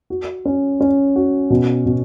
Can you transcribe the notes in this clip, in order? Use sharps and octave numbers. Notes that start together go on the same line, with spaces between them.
F#4
C#4
C#4
F#4
B2
B2